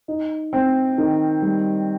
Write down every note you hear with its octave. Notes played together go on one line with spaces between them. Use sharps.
D#4
C4
D#3
G3